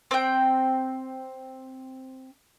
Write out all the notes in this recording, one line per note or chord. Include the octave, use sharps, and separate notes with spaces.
C4 G5